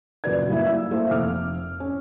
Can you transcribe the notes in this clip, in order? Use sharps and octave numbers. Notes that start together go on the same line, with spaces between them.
F#1 A#2 F#3 B4 D5 G#6
G3 A#3 D#4 E4 E5
E6
A3 A#3 E4 C5 E5
F1 D6 F6
C#4